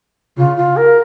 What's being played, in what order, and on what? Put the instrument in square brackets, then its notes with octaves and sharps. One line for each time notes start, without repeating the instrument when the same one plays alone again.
[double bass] C#3 [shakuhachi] F4
[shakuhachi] F4
A#4